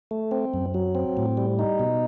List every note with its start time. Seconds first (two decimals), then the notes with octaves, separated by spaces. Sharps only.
0.11 A3
0.31 C4
0.54 F#2
0.74 F#3
0.95 C4
1.17 A2
1.37 G3
1.59 D#4
1.79 B2